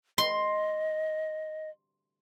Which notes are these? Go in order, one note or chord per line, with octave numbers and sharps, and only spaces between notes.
D#5 C6